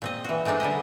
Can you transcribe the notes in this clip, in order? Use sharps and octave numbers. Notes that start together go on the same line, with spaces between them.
A#2 C4 D#5
E3 F#4
G#3 A3 C4 D4 D#4
D3 G3 E4 D#5